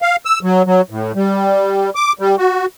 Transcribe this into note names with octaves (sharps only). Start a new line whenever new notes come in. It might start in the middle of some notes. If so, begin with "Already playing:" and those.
F5
E6
F#3
F#3
A2
G3
D6
G3
F#4